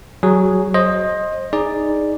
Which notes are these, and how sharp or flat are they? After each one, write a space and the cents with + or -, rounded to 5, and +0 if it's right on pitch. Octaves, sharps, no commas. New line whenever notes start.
F#3 +15 G#4 +0
C5 +25 D#5 +0
D#4 +0 G#4 +0 D5 +0